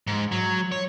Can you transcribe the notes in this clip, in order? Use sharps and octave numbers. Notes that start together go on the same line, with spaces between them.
G#2
F#3
C#5